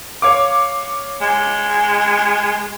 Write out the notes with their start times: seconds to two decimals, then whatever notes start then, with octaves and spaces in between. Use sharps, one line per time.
0.22 C#5 F5 D6
1.21 G#3